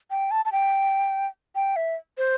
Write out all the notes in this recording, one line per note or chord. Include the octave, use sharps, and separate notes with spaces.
G5
A5
A5
G5
G5
E5
C5